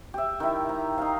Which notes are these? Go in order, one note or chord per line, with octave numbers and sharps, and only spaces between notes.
G4 E5
D#3 E4
A#5
D#4 F5